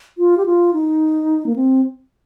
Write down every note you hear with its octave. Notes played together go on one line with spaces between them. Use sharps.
F4
G4
F4
D#4
A#3
C4